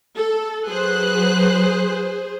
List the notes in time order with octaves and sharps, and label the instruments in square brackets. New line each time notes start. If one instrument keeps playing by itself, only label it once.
[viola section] A4
[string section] F#3 B4 F#6 [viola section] G#4 C5